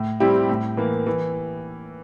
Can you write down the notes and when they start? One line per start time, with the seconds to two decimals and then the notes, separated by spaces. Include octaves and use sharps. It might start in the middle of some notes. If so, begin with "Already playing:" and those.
Already playing: A2
0.20 G3 C4 E4 G4
0.49 A2
0.77 E3 A#3
1.07 E3